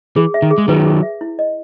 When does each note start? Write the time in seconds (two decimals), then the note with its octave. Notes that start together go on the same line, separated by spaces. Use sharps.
0.16 E3 G#4
0.34 E5
0.42 D#3
0.51 G#4
0.58 G#3
0.68 D#3 F#3 B4
0.86 G#4
1.03 E5
1.21 E4
1.39 D#5